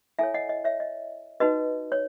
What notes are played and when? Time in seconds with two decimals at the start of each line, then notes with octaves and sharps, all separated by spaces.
0.19 E4 A4 C#5 E5 G#5
0.34 D#5 F#5
0.49 D#5
0.64 C#5 E5
0.80 D#5
1.40 D#4 F#4 B4 D#5
1.92 C#5